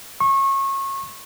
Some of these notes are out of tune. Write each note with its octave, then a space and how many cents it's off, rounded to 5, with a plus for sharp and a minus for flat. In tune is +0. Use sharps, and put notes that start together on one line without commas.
C#6 -30